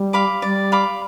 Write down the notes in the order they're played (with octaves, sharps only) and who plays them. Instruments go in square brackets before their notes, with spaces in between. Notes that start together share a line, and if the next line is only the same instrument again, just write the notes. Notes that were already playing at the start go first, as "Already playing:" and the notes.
Already playing: [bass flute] G3
[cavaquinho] F5 B5 D6
[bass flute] G3 [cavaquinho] D5
[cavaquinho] F5 B5 D6